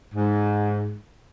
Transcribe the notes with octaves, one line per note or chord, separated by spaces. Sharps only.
G#2